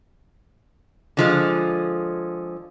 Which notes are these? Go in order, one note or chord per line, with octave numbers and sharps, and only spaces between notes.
D3 F3 G#3